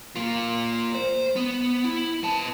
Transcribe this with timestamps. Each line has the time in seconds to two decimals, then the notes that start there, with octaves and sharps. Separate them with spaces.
0.16 A#3 F4
0.95 C5
1.36 B3
1.85 E4
2.23 B3 A5